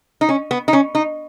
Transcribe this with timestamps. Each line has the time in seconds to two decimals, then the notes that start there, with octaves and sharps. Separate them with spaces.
0.21 D#4
0.29 C#4
0.51 B3
0.68 D#4
0.73 C#4
0.95 D#4